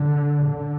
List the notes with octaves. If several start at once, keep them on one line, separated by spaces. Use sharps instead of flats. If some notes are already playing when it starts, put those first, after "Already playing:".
Already playing: D3
D3